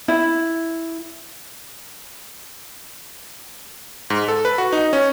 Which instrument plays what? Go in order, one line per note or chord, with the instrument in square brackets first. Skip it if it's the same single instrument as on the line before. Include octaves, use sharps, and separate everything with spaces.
[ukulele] E4
[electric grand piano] G#2
A4
B4
F#4
D#4
C#4